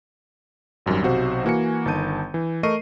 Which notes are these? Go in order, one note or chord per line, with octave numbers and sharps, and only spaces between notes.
G#1 F#2 D#3 G3
B1 C3 F#4 C5
E3 A#3 F#4 G#5 C#7
G1 D#3 A5 G6 D#7
E3
A3 A#4 D#5 C#6 C7 D#7